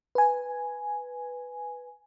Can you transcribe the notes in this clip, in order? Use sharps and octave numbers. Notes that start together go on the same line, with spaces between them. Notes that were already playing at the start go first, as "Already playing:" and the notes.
B4 G#5